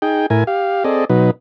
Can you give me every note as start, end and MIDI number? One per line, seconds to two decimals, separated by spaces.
0.02 0.26 63
0.02 0.26 68
0.02 0.26 79
0.30 0.44 45
0.30 0.44 64
0.30 0.44 70
0.30 0.44 80
0.47 0.84 67
0.47 0.84 77
0.84 1.05 60
0.84 1.05 68
0.84 1.05 69
0.84 1.05 74
0.84 1.05 75
1.09 1.31 47
1.09 1.31 54
1.09 1.31 63
1.09 1.31 71